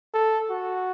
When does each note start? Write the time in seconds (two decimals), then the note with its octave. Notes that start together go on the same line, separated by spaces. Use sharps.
0.14 A4
0.50 F#4